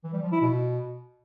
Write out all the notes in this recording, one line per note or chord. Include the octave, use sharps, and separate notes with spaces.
E3
G3
F3
E4
B2